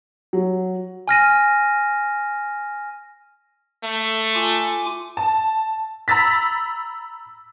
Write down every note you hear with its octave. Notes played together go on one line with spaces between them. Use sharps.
F#3
G#5 F6 A#6 D#7
A3
F4 G#5 D6
A5
A#5 B5 E6 A6 B6